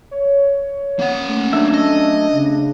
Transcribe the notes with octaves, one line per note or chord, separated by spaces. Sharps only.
C#5
A#3 F#5
A3 C#4
F#3 A3 D4 E5
D#5
C#3